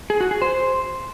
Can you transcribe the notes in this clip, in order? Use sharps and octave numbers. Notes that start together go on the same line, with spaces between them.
G#4
F#4
G#4
C5